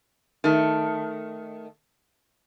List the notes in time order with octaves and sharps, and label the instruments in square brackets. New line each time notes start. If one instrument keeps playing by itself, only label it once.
[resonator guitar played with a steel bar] D#3 A3